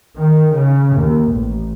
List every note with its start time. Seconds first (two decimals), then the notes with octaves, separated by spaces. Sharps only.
0.17 D#3
0.53 C#3
0.97 D#2
1.27 A1